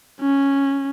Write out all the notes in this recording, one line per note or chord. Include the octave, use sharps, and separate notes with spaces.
C#4